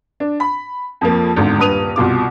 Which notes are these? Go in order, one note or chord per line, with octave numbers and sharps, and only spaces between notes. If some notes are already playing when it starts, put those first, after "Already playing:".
D4
B5
F2 F3 A#3
G#1 E2 G#2 D3
D#1 G2 B4 D#6 D#7 F7
C2 B2 F4 D6